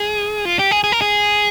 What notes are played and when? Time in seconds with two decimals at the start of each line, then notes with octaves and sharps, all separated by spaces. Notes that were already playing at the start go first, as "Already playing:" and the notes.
Already playing: G#4
0.45 F4
0.59 G4
0.71 G#4
0.84 G#4
0.92 A#4
1.01 G#4